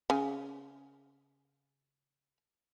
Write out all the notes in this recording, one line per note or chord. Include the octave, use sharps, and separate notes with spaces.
C#3 G#5